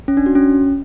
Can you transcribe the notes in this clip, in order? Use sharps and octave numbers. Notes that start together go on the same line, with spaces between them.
C#4
D4
F#4
C#4